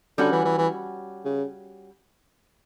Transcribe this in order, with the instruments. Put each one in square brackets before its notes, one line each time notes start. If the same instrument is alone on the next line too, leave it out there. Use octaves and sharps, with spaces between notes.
[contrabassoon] D3 [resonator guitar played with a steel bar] G3 C#4 F#4
[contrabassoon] E3
E3
E3
C#3